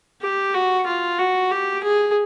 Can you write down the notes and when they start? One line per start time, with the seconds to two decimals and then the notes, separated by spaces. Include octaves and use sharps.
0.22 G4
0.54 F#4
0.87 F4
1.19 F#4
1.51 G4
1.84 G#4